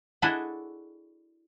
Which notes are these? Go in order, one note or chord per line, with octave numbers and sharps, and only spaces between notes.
D4 E4 F#4 G#4 A4 D#5